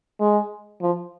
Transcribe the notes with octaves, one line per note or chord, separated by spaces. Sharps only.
G#3
F3